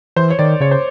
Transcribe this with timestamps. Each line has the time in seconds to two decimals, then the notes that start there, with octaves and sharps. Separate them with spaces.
0.16 E3 C5
0.30 C#5
0.39 D#3 D5
0.60 C#3 C#5
0.71 C5